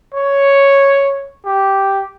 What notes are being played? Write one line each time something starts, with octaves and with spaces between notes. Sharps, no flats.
C#5
G4